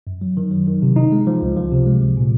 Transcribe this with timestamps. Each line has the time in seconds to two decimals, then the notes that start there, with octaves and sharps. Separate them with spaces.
0.07 F#2
0.21 F#3
0.37 D#3
0.51 F#3
0.67 D#3
0.82 C3
0.96 D#4
1.12 G#3
1.27 F3
1.42 C#2
1.57 F3
1.72 C3
1.87 G#3
2.02 F3
2.17 A#2